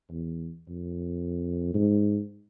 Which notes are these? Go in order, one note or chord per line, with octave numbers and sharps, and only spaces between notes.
E2
F2
G#2